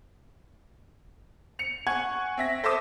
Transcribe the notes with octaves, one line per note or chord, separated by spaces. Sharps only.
C#7 F7
F#5 G#5 C#6 G#6
C4 E5 A#6
A4 C5 E5 A5 D6 D#6